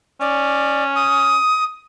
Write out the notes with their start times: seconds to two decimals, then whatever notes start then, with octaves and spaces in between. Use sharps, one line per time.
0.21 C#4 D5
0.96 D#6